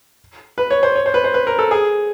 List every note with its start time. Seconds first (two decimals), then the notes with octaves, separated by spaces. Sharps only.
0.58 B4
0.70 C#5
0.83 C5
0.95 C#5
1.06 C5
1.14 B4
1.24 C5
1.34 B4
1.47 A#4
1.59 A4
1.71 G#4